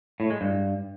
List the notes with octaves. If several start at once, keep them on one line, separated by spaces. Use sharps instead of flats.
A2
G#3
G2